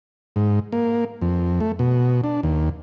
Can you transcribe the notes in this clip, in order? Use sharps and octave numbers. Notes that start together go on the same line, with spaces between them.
G#2
A#3
F2
A3
B2
D4
D#2